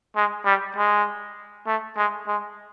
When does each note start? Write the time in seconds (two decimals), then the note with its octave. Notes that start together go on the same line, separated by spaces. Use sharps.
0.16 G#3
0.45 G3
0.76 G#3
1.67 A3
1.97 G#3
2.27 G#3